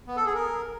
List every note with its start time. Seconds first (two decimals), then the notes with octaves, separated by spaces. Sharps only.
0.08 B3
0.17 A4
0.26 G#4
0.35 A#4